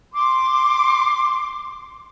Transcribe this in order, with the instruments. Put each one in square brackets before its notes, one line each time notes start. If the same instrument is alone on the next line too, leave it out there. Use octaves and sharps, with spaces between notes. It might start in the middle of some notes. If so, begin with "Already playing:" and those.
[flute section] C6 D6